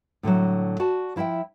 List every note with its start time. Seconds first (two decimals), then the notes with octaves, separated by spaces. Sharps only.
0.23 A2 D3 F3 F#3
0.80 F#4 D5 A5
1.16 F3 E4 D#5 E5 G5